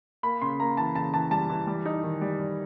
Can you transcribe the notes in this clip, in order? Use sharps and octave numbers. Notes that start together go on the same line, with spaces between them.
A#3 B5
C#3 C6
A#3 A#5
E3 A5
C#3 A5
E3 A5
G3 A5
E3
G3
D#4
D#3
G3
G3